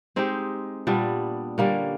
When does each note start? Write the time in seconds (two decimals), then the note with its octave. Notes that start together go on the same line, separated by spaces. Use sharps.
0.16 G#3 C4 D#4 G4
0.87 A#2 G3 B3 D4
1.58 D3 G3 A#3 C#4